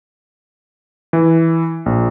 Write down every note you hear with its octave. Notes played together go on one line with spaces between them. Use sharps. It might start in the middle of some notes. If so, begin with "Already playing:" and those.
E3
A#1